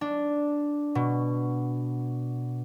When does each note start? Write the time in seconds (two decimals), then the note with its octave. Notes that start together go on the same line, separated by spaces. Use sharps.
0.01 D4
0.95 B2